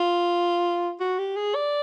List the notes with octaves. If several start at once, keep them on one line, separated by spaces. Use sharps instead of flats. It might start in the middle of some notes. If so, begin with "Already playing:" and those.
Already playing: F4
F#4
G4
G#4
D5